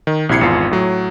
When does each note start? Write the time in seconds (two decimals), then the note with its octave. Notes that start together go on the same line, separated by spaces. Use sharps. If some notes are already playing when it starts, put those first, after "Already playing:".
0.07 D#3
0.29 A#1 C3 E4 G#6 C7 C#7
0.41 G#1 E2 F4
0.71 A2 F#3